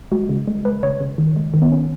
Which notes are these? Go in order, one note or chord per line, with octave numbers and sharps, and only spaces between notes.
G#3 F#4
C#3
G#3
G#3 B4
C#3 C#5
C#3
D#3
G#3
D#3
B3
C#4